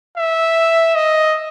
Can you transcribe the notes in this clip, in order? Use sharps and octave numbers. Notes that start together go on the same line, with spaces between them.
E5
D#5